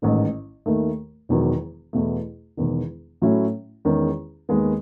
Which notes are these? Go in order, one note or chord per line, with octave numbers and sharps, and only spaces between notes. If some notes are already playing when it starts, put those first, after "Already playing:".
A1 G#2 D#3
D#2 D#3 A3
E1 E2 D#3 F#3
E2 B2 A3
E1 E2 D#3
A2 F#3 A3 C#4 E4
E2 D#3 G#3 C#4
D#2 D#3 G#3 B3